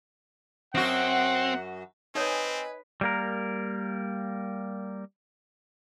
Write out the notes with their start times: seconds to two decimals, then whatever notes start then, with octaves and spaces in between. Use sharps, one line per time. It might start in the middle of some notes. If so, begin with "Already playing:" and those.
0.75 F#2 C4 F#4 F#5
2.15 C4 D#4 B4 C#5 D#5 G#5
3.01 G3 A#3 A#4